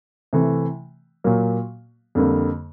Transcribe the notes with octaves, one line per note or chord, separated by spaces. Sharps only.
C3 E3 A3
A#2 F#3 A#3
F2 D3 G3 A#3